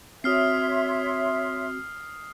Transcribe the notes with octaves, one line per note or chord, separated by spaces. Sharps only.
C4 F#4 C#5 E5 C6 D#6 F6 C7